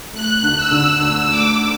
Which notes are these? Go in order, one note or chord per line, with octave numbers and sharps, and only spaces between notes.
A3 F#6
D2
E6
D3
D2 E6
A3 D6